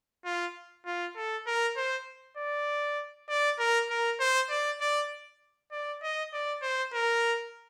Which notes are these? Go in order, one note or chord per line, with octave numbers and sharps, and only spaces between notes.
F4
F4
A4
A#4
C5
D5
D5
A#4
A#4
C5
D5
D5
D5
D#5
D5
C5
A#4